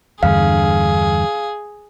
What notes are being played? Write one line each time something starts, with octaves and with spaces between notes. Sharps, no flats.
E2 G2 D3 G#4 F5